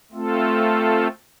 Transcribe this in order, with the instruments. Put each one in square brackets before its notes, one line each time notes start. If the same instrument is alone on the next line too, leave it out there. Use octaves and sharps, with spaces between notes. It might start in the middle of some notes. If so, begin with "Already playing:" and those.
[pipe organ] A3 C4 F4 A4